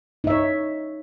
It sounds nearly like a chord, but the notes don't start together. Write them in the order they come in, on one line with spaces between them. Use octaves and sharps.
D#4 E5 C#5